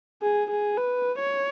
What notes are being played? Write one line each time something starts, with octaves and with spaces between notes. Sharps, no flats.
G#4
G#4
B4
C#5